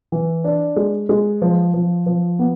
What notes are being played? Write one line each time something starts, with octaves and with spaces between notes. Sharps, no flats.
E3
D4
G#3
G#3
F3
F3
F3
B3